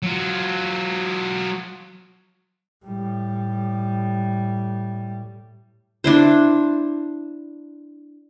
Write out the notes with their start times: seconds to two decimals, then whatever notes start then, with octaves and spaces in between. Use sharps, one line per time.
0.02 F#3 F4
2.85 A2 G3
6.04 D4 E4 C5